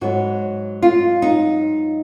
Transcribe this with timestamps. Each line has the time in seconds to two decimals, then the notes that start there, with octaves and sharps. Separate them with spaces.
0.01 G#2 F#3 B3 F#4
0.82 F4
1.22 D#4